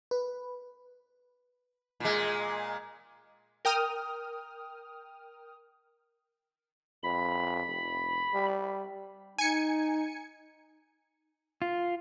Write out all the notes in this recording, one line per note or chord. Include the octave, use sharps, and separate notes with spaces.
B4
A#2 G#3
A#4 G5 D#6 F6
F2 B5
F1
G3
D#4 G#5 C#7
F4